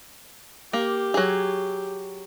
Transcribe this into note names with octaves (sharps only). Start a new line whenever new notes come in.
A#3 G4
F#3 G#4